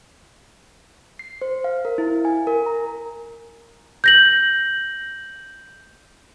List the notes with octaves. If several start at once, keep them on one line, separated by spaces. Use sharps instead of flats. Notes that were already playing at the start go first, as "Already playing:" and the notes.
C7
C5
F5
A#4
E4
G#5
A#4
A#5
G6 A#6 F#7